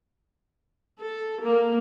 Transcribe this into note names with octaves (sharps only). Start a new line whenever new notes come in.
A4
A#3